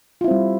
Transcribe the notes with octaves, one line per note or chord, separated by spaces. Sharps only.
G3 C4 E4 F4